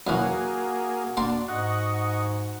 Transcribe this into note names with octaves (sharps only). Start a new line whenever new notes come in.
F#2 E3 A#3 F#4 G#4 F5 F#5
A#3 D4 G5 C6
G#2 D#5 F#5 C#6